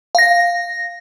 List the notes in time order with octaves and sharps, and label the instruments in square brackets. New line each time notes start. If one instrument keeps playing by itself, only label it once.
[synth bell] F5 A#6